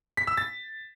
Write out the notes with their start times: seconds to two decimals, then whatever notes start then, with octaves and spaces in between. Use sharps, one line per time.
0.17 B6
0.27 E6
0.37 A6